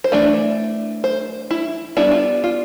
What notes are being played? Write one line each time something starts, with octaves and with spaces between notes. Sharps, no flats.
C5
E3 A3 D4 D5
C5
E4
G3 B3 D4 E4
F4
F4